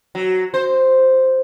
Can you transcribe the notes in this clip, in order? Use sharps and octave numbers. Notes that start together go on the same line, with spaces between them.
F#3
C5